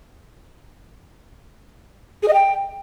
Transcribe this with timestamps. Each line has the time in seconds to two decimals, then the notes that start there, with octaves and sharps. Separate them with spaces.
2.23 G#4
2.28 D#5
2.33 G5